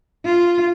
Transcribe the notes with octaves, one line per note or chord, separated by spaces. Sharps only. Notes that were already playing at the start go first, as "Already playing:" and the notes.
F4